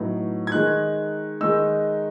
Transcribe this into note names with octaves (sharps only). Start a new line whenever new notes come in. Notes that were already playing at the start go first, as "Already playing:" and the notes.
Already playing: A2 F#3 B3 D#4
G#6
D#3 G#3 D#4 F#6
D#3 G#3 D#4 E6